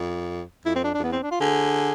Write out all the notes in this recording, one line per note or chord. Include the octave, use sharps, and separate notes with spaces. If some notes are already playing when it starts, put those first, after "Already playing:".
Already playing: F2
F2 E4
C4
D4
D4
F2
E2 B3
C4
D4
F4
D3 G#4